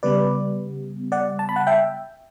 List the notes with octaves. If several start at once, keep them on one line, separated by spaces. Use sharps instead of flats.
C#3 G3 B3 B4 D5
D5 F#5
A5
B5
F#5 A5
E5 G5